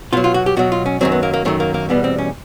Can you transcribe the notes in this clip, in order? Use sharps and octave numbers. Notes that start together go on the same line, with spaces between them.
B2 F#3 F4
F4
F#4
G4
B2 F#3 F#4
F4
C#4
F#2 D#3 F#3 C4
B3
A#3
A#3
F#2 D#3 F#3 A3
A#3
A#3
E2 B2 G3 B3
C4
C#4